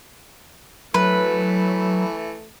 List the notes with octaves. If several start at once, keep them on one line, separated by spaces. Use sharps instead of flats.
E3 F#3 A3 B4